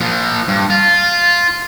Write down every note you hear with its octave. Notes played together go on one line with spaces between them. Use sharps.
A#2 F3
G2
F4